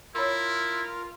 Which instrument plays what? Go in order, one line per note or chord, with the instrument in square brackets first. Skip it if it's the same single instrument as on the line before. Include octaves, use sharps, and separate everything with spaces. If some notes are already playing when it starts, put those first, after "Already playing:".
[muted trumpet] E4 [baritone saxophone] F4 [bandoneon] A#4 [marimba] C#5 B5 E6